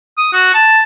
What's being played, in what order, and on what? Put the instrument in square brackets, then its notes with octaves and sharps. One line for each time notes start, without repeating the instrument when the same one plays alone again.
[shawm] D#6
F#4
A5